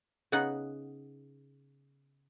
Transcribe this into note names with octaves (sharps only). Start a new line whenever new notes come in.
C#3 B3 D#4 F#5